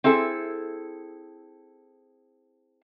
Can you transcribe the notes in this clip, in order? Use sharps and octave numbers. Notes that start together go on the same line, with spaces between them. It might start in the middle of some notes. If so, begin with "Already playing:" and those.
C4 E4 G#4 A4